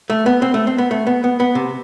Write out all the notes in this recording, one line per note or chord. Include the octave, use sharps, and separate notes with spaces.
A3
B3
C4
A3
C4
B3
A3
B3
B3
B3
C3